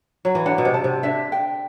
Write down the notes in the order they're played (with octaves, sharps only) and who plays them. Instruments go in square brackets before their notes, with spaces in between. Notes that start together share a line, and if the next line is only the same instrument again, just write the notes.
[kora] F#3
E3
[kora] D3 [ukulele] F#5
[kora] B2
C3
[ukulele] A5
[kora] C3
[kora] D3 [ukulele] E5
[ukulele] G5